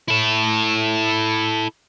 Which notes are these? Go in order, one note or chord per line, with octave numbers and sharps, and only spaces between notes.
E4 A4